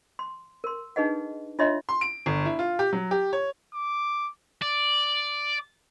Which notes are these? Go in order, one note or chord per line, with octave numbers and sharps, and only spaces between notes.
C6
A#4 C6
D4 D#4 G#4 B4 D#5 F#5
D4 F4 C#5 D#5 E5 C6
C6
D7
G1
E4
F4
G4
F#3
G4
C#5
D6
D5